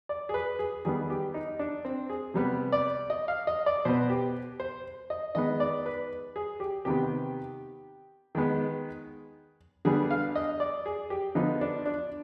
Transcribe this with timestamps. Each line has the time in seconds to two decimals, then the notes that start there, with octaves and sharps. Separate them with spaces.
0.09 D5
0.29 G#4
0.34 B4
0.59 G#4
0.85 D#3 G3 B3 G#4
1.10 G4
1.34 D#4
1.59 D4
1.85 C4
2.10 G#4
2.34 C3 G3 B3
2.72 D5
3.10 D#5
3.28 F5
3.47 D#5
3.66 D5
3.85 B2 B3 C5
4.10 G4
4.60 C5
5.10 D#5
5.35 D#3 G#3 B3 D#5
5.60 D5
5.86 B4
6.36 G#4
6.60 G4
6.85 C3 D#3 B3 G4
8.35 D#3 G#3 B3
9.85 D3 G3 B3 G#4
10.11 F5
10.36 D#5
10.60 D5
10.86 G#4
11.10 G4
11.35 D3 F3 B3 D#4
11.61 D4
11.86 D4